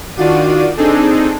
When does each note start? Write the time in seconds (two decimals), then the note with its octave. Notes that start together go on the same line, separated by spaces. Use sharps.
0.16 D#3 D4 F4 F#4 D5 D#7
0.77 C4 D4 D#4 G#4 A4